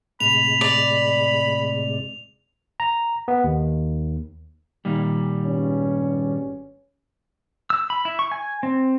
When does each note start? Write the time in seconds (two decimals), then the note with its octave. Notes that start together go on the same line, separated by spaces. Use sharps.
0.20 A2 C3 G#3 B5 F7
0.61 D5
2.80 A#5
3.28 B3
3.44 D#2
4.85 A#2 D#3 G3
5.43 G#1 G2 C#4
7.70 E6
7.90 B5
8.05 E4
8.19 C#6
8.32 G#5
8.63 C4